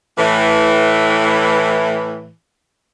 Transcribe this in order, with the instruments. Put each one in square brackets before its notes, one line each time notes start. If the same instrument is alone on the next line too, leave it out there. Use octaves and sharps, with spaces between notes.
[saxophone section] A2 E3